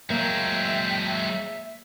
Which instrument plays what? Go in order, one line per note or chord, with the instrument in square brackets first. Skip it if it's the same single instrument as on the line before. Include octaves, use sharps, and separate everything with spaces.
[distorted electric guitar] F#3 G#3 [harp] A#3 [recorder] E5 [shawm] G5